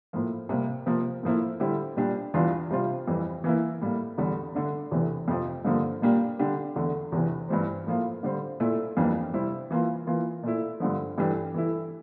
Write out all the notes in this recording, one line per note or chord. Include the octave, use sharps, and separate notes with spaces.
A2 F3 A#3
C3 G3 A#3
C3 F3 A#3
A2 F3 A#3 E4
D3 G3 C4 E4 G4
A#2 G3 D4 G4
E2 E3 G3 D4 F4
C3 G3 C4 F4
F2 E3 G3
E3 A#3 E4
A2 G3 A#3
E2 D3 G3
D3 A3 D4
E2 C3 E3 A3
F2 C3 F3
G2 D3 F3 A#3
A#2 G3 A#3 D4 G4
D3 G3 D4 G4
E2 D3 A3
E2 C3 E3
G2 E3 G3 C4
A2 F3 A#3 F4
D3 G3 C4
A#2 A3 E4
F2 E3 G3 A#3 D4
C3 G3 C4 E4
E3 A#3 F4
E3 A#3 F4
A#2 A3 E4
G2 D3 F3
G2 E3 A3 D4 G4
E3 A3 E4